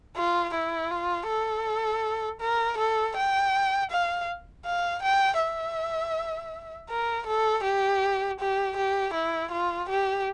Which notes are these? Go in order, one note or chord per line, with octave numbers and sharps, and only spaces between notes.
F4
E4
F4
A4
A#4
A4
G5
F5
F5
G5
E5
A#4
A4
G4
G4
G4
E4
F4
G4